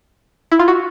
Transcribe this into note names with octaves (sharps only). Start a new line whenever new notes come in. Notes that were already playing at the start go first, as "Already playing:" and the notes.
E4
F4
F#4